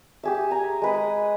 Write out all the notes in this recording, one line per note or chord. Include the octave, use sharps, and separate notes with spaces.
G4 G#4 E5
G#5 A#5
G#3 B4 D#6